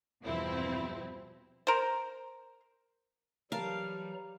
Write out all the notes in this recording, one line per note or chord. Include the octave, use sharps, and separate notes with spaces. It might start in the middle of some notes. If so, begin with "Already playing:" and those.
E2 G2 B2 F3 C4 E4
A#4 C5
E3 F#3 G3 A#4 F5 A5 A#5